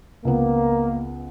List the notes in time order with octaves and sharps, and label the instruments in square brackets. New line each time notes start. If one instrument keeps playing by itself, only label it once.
[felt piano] C#2 B3 [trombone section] A#3